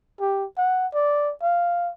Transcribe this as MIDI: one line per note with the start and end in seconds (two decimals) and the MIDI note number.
0.20 0.45 67
0.58 0.87 78
0.94 1.32 74
1.42 1.91 77